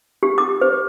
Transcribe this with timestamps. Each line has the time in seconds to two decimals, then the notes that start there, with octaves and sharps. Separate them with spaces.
0.23 G4
0.38 D6
0.62 C5